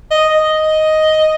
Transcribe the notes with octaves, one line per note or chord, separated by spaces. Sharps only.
D#5
D#5